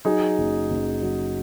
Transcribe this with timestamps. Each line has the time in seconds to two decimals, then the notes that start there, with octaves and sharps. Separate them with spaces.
0.05 F#3 D#4 G#4
0.38 F#1
0.70 F#1
1.03 F#3